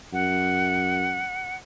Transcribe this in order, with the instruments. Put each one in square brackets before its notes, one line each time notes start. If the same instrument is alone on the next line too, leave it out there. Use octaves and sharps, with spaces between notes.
[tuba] F#2 [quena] F#5